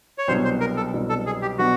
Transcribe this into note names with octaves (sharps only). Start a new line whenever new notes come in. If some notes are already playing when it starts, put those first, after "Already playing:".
C#5
C2 B2 F#3 B3 D4 C5
C5
A#4
A4
C2 B2 F#3 B3 D4
A4
G#4
G4
B2 F#3 B3 D4 F#4